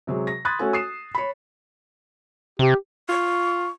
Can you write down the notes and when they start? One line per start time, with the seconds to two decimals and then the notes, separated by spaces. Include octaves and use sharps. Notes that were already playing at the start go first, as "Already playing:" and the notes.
0.07 C3 F#3 G#3
0.27 A#6
0.45 B5 C6 D#6 F#6 G#6 A6
0.59 A3 C#4 F#4 A4 G#5
0.73 D#6 C7 E7
1.15 C#5 B5
2.59 C3 G4
3.09 F4 C#6